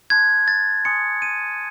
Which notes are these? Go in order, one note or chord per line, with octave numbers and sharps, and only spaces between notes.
A5 C6 F#6 G#6
A6
G#5 C6 D#6 F#6 C#7
D#7